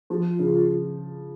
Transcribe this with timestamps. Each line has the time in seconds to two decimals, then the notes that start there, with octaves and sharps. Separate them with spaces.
0.10 F3 G#4
0.14 F4
0.39 C#3